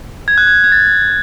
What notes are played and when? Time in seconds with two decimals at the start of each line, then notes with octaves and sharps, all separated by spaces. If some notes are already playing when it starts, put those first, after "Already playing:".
0.28 G#6
0.38 F#6
0.47 G#6
0.64 G#6
0.72 A6